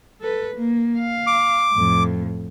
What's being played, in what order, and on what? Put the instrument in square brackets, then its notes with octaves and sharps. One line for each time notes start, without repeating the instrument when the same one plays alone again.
[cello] A4 B4
A#3
F5
[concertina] D6
[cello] F2 A2